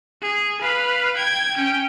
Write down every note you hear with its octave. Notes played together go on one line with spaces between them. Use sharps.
G#4
B4 F5
G5 G#6
C#4 G5